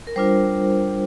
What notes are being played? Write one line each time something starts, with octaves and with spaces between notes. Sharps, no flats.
A#4
G3 D4 F4 C5